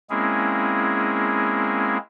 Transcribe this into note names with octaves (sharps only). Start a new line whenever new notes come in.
G#3 A#3 C4 C#4 E4 G#4